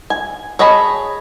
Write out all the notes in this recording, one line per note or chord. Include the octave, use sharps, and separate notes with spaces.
G#5
G#4 C#5 D#5 A5 B5